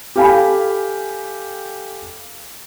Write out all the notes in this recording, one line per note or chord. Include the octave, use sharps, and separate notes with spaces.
G4 A4 F5 G5 G#5 B5